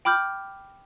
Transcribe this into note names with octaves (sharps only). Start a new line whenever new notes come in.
G5 B5 D6 F6 G6